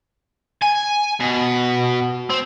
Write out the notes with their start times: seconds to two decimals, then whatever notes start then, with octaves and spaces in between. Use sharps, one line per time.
0.62 G#5
1.20 B2
2.30 C4